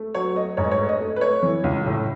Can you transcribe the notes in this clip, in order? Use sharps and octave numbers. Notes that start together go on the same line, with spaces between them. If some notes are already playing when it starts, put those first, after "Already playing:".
Already playing: A3
F#3 C#5
A3 D#5
G#2 C#5
D#5
C#5
A3
D#5
A3
B4
A3 C#5
E3
C#2
A2